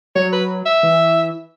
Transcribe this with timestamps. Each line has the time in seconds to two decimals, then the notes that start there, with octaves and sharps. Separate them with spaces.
0.16 F#3 C#5
0.33 B4
0.66 E5
0.83 E3